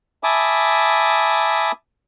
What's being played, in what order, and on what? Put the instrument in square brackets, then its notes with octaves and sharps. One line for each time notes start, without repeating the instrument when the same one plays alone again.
[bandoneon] E5 G#5 A5 B5 D6 D#6